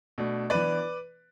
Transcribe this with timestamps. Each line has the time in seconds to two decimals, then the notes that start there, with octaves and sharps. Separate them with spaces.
0.18 B2 A3 D4
0.50 E3 B3 D4 B4 D5